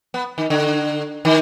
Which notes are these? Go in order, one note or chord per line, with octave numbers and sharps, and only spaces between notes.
B3
D#3
D3
D#3